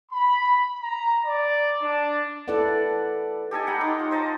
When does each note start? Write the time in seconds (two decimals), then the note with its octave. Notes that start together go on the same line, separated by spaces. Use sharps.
0.11 B5
0.82 A#5
1.25 D5
1.82 D4
2.48 E4 A4 B4 D5 F#5
3.51 G4 A4 D#5 G#5
3.67 F#5 G5 A#5 B5
3.81 D#4 C6 D6
3.99 F4
4.11 C5 D#5 A5 A#5